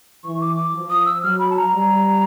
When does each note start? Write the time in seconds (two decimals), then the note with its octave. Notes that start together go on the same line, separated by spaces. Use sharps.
0.24 E3 C#6
0.41 D6
0.57 D6
0.74 F3
0.90 D#6
1.06 E6
1.22 F#3 F6
1.39 B5
1.50 A5
1.57 A#5
1.73 G3